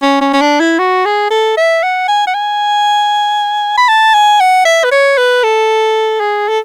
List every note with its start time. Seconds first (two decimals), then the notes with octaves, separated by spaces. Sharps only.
0.02 C#4
0.21 C#4
0.33 C#4
0.41 D4
0.60 E4
0.79 F#4
1.05 G#4
1.30 A4
1.57 E5
1.83 F#5
2.08 G#5
2.27 F#5
2.34 G#5
3.77 B5
3.88 A5
4.14 G#5
4.40 F#5
4.65 E5
4.84 B4
4.92 C#5
5.17 B4
5.43 A4
6.20 G#4
6.48 A4